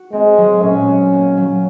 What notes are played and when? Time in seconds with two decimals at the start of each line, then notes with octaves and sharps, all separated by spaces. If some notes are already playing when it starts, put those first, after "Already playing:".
Already playing: F#4
0.13 G#3 C4
0.38 F#3
0.62 A#2 C#4
0.88 F#4
1.13 A#3
1.37 F#3